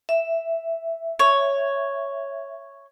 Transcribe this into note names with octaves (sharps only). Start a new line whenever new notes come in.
E5
C#5